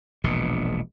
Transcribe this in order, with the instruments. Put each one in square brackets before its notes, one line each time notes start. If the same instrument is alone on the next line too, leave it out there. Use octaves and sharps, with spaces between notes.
[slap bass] E1 A#1 B2